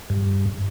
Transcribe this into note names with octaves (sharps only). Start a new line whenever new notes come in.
G2